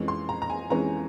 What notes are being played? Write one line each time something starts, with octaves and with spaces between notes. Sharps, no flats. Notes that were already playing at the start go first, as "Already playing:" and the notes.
Already playing: F2 E3 G#3 C#4
C6
A#5
A#5
G#5
F2 E3 G#3 C#4 A#5